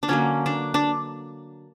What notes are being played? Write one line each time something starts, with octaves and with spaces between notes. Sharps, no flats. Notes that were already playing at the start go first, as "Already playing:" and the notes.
D4
D3 F#3 A#3 C#4
D4
D4